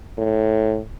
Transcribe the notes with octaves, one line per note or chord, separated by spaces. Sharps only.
A2